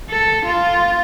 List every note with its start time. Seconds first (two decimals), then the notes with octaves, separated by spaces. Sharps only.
0.11 A4
0.46 F4